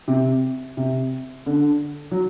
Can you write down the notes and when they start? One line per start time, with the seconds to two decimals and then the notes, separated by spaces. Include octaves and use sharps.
0.08 C3
0.77 C3
1.46 D3
2.11 F#3